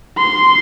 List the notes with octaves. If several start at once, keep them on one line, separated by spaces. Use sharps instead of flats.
C6